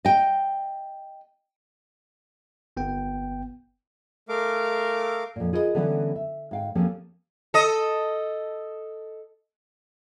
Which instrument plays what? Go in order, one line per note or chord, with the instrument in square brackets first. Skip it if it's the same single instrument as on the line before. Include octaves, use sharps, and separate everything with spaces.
[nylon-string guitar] D#5 G5
[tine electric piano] G1 B3 G5
[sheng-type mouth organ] A3 A#4 F5 D6
[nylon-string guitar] F2 A#2
F4 G#4 A#4 B4 C#5 D#5
D3 E3 G3 B3 C#4 D4
E5
G#2 F5 G5
F3 A#3 C4 C#4 G4 A4
[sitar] A4 D#5